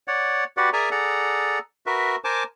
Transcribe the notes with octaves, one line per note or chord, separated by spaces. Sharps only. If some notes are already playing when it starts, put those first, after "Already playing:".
C#5 D5 F#5
F#4 G4 B4 D5 F#5
G#4 A#4 D5 E5 G#5 A#5
G#4 A4 D5 F#5 A#5
F#4 A#4 B4 E5
A#4 C5 G#5 A5 D6